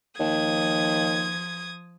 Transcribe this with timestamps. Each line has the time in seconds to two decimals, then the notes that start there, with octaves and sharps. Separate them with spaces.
0.19 D#2 F3 D#6 G#6